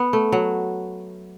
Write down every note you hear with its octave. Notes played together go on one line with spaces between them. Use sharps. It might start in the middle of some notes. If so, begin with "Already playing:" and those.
Already playing: B3
A3
F#3